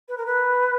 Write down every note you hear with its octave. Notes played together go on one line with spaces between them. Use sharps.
B4
A#4
B4